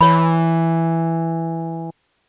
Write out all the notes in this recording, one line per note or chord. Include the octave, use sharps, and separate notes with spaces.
E3 C#5 B5